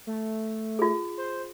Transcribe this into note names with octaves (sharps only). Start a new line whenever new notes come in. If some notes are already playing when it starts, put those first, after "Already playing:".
A3
F4 G#4
C5